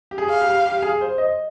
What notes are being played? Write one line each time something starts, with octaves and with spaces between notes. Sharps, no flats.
G4
G#4
F5
G4
G4
G#4
C5
D#5